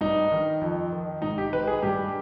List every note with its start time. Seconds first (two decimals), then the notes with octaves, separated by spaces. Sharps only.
0.01 G2 D#4
0.32 D#3
0.61 F2
0.92 D#3
1.21 G#2 D#4
1.38 G4
1.53 D#3 B4
1.67 G#4
1.83 G2 G4